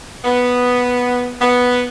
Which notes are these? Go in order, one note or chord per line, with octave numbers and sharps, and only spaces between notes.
B3
B3